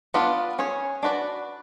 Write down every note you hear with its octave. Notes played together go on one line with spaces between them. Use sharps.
B3 D4 F4 B4 D5
C#4 G#4 C#5
D4 F#4 B4 D5